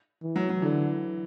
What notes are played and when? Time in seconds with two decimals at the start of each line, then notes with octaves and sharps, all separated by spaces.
0.23 E3
0.36 F#3
0.49 F#3
0.62 D3 E3